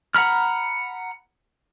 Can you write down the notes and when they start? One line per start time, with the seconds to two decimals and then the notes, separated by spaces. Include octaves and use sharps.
0.15 F#5 A#5 B5 F6